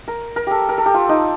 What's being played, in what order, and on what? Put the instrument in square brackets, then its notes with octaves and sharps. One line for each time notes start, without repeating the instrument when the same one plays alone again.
[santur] A#4
A#4
G4 A4
A#4
A4
G4
F4
D#4